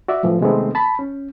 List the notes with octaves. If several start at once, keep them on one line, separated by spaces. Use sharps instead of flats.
F#4 D5 E5
F#2 A2 E3 F3
C3 D#3 G#3 A3 B3 C4
A5 B5
C#4